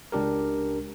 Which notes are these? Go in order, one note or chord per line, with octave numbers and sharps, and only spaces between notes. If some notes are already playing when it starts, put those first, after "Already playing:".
C#2 D4 G4 A#4